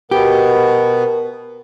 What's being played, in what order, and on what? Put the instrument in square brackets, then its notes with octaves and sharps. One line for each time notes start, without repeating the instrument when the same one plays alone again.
[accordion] B2 B3 [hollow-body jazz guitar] G4 [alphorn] A#4